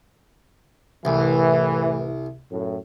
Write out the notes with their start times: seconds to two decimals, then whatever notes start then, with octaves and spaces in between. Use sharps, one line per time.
1.05 C2 A2 E3
2.51 F#2 A2